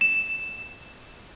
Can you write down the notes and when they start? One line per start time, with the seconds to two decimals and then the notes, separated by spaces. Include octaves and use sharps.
0.01 E7